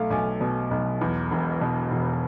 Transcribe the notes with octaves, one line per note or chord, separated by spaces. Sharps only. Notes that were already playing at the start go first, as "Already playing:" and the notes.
Already playing: B1 A3 F5
B1 G#5
B2
B1
E2
E1
B2
E1